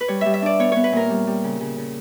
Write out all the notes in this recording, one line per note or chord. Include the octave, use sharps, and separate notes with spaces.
B4
G3 C#5
G3 E5
E5
D4 D5
B3 C#5
B3 C#5
B4
A#2 A#4
G3
G3
C#3
C#3
C#3